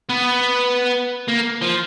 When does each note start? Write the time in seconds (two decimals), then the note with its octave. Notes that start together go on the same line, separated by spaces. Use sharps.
0.10 B3
1.28 A#3
1.61 F3